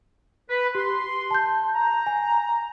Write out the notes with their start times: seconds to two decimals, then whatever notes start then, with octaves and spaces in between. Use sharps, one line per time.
0.49 B4
0.75 G4 C6
1.31 A5 G6
1.74 A#5
2.06 G#5